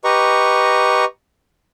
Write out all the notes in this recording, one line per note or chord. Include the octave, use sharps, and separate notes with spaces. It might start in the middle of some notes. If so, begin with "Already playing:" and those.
G4 B4 D#5 A#5 C#6